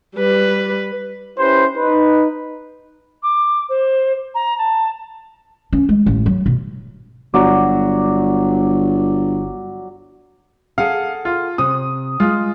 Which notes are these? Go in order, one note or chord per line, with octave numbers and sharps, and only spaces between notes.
G3 B4
C#4 E4 G4 B4 C5
D#4 B4
D6
C5
A#5
A5
C#4
G#3
A1
F#3
B2
G1 F#3 D5
G#4 A4 F5 F#5
F4
C3 D#6
G#3 F4